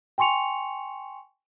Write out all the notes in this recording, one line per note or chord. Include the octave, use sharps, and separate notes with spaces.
G5 G#5 C6 C#6 C#7 F7